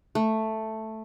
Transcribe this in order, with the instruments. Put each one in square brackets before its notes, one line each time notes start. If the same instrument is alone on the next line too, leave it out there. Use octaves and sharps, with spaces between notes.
[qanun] A3